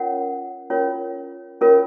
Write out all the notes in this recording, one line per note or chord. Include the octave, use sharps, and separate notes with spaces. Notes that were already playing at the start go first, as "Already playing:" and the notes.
Already playing: C#4 F4 A#4 C#5 F#5
C#4 F4 A#4 C#5
C#4 F4 A#4 C#5